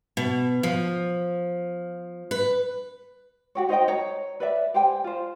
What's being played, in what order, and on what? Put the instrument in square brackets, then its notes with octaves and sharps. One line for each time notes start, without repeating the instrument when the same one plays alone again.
[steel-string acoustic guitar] B2
F3
B4
[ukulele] F#4 G4 C#5
D#4 C5 D#5 G5
C#5 A#5
B4 D5 E5
G4 C5 G5 G#5
F4 C5